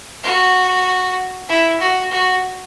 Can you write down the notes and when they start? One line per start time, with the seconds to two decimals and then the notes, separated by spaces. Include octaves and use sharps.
0.23 F#4
1.49 E4
1.80 F#4
2.11 F#4